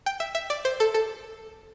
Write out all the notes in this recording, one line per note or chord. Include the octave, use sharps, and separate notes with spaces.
G5
E5
E5
D5
C5
A4
A4